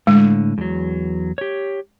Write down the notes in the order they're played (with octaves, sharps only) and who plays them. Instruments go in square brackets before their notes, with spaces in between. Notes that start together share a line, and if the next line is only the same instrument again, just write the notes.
[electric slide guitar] A2 D3 [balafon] G#3
[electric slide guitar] E2 F#3
G4 C#5